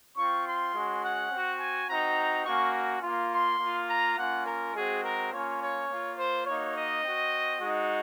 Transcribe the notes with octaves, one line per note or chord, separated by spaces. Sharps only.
C4 F4 C#6
C6
G#3 C#4 F#4
F#5
C4 F#4
G#5
C4 D#4 F#4 A#5
A#3 C#4 F#4 C#6
A#3 F4
C6
A#3 F4
A#5
A#3 C#4 F4 F#5
A#4
G#3 C4 F#4 G#4
A#4
A#3 C#4 F4 C#5
C#5
A#3 F4
C5
A#3 D#4 F#4 C#5
D#5
C4 F#4
G#3 D#4 F#4